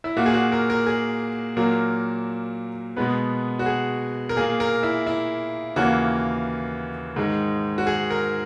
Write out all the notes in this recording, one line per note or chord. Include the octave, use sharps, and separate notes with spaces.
E4
A#2 A#3 F#4
G#4
F#4
A#4
A#4
G#4
A#2 F#3 A#3 A#4
B2 G#3 B3 B4
F#4
G#4
A#4
A#2 A#3 G#4
A#4
E4
E4
D#2 C#3 E3 A#3 F#4
G#2 D#3 G#3
F#4
G#4
A#4